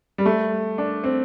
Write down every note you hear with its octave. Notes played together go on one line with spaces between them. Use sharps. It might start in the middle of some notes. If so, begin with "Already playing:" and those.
G3
A3
D4
C4